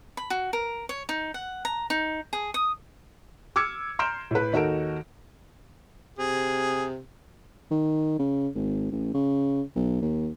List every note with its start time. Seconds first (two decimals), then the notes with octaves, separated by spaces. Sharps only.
0.17 B5
0.30 F#4
0.53 A#4
0.89 C#5
1.09 D#4
1.34 F#5
1.65 A#5
1.90 D#4
2.33 G#4
2.54 D#6
3.56 D6 E6 F6 G#6 C#7
3.99 A#5 C6 F6 G6 D7 E7
4.31 A2 B4
4.53 D#2 D#4 F#4 A4 A#4 D7
6.18 C3 G#4
7.71 D#3
8.19 C#3
8.55 G#1
8.92 A1
9.14 C#3
9.76 B1
10.02 D#2